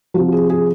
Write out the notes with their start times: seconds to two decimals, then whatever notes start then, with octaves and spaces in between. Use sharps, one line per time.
0.14 C3 F3 F#4
0.32 G#4
0.50 G#4